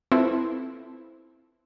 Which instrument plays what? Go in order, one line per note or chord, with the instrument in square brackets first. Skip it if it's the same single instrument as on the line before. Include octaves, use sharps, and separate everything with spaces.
[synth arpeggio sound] C4 E4 F4 A4 B4 C5